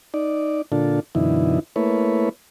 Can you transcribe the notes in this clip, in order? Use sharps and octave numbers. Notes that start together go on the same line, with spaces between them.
D#4 D5
A#2 D3 D4 F4 A4
F#2 B2 D3 E3 D#4 E4
A3 A#3 E4 B4 C#5